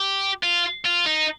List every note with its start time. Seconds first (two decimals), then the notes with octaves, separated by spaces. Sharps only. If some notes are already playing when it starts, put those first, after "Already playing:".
Already playing: G4
0.43 F4
0.86 F4
1.06 D#4